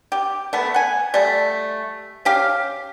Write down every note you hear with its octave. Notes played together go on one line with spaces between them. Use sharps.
G4
A3 B3
F#5 G#5
G3 A3
C#4 G4 F5